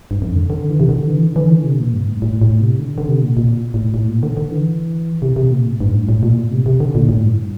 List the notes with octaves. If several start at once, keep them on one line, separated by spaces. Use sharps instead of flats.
G2
F2
D3
D3
E3
C3
D3
E3
D3
E3
D3
C3
A#2
G2
A2
A2
A2
C3
D3
D3
C3
A#2
A#2
A2
A2
A#2
D3
D3
E3
C3
C3
A#2
A2
G2
A2
A2
A#2
A2
C3
C3
D3
A#2
A2
G2